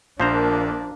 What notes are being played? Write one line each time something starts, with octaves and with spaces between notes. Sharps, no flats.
A#1 F3 A#3 D4 C5 A#5